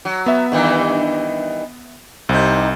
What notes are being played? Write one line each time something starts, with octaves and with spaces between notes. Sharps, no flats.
F#3
B3 E5
G2 D#3 E3
C2 C3 D#4